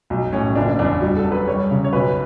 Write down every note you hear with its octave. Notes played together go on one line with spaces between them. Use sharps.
B1
A2 C#4
F#1 D4
E2 D4
G3 F#4
A4
F#2
B4
G3 C#5
C#3
C#5
B1 B4